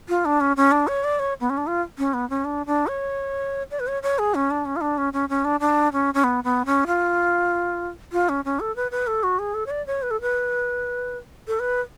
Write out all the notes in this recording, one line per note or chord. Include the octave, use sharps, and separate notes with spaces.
F4
D4
C#4
C#4
D4
C#5
D5
C#5
B3
C#4
D4
F4
C#4
B3
C#4
D4
D4
C#5
D5
B4
C#5
C#5
G#4
C#4
D4
C#4
F4
D4
C#4
C#4
C#4
D4
D4
C#4
C#4
B3
B3
C#4
F4
F4
C#4
C#4
A4
B4
B4
A4
F#4
G#4
A4
C#5
D5
C#5
B4
A4
B4
A4
B4